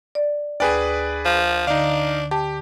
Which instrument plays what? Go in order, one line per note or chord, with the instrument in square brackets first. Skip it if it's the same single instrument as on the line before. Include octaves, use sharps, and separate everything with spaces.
[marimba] D5
[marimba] D2 G5 G#5 [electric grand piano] G#4 B4 D5
[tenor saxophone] F3
[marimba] D3 [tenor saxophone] D4 [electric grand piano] D#4 F5
[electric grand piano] G4 [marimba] A5